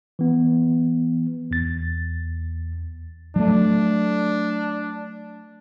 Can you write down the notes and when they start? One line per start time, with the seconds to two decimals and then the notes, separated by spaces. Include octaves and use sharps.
0.19 E3 B3
1.51 E2 A6
3.36 F#3 A3 D4